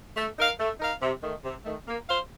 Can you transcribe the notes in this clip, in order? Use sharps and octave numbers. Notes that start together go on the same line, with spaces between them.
A3
D#4 A#4 F5
A3
D#4 A#4 F5
C3
D#3 A3
C3
D#3 A3
A#3
F4 C5 F5